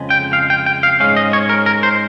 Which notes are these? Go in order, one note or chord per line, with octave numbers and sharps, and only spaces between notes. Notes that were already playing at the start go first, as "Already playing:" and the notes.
Already playing: F2 C#3 G#3
G5
F5
G5
G5
F5
G#2 D#3 G#3 C#4 F5
D#5
C#5
A#4
A#4
C5